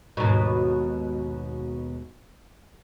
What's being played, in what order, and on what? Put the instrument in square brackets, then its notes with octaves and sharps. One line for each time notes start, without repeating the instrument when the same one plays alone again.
[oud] D#2 G#2 B2